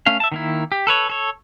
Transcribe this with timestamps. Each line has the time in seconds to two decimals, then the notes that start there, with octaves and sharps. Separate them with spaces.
0.06 A3 C#4 F5
0.20 E5 A5
0.32 D#3 A#3 E4
0.72 G4
0.87 A4 B4 C#5
1.10 A4 C#5